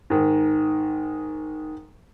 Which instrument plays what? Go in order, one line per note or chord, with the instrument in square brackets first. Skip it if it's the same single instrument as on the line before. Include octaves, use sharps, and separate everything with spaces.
[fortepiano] G#2 D#3